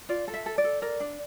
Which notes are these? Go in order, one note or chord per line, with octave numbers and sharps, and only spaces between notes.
F4 D5
A4
E5
A4
D5
A4
A#4 D5
D4